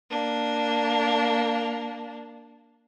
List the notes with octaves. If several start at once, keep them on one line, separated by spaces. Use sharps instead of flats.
A#3 D4